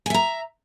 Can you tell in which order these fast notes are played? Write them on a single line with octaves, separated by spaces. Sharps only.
G#5 E5 A#5